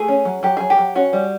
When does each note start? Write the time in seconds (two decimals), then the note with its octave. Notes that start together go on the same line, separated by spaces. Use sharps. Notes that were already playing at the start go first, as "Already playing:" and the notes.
Already playing: A3 G#4
0.08 C#4
0.25 F#3
0.43 F#3 G4
0.57 F#3 G#4
0.70 G4
0.78 F#3
0.95 C#4 F#4
1.13 G3